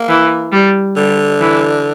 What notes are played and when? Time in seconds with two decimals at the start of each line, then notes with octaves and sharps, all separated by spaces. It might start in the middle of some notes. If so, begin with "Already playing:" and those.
Already playing: A#3
0.09 E3
0.52 G3
0.96 D3 G3
1.40 E3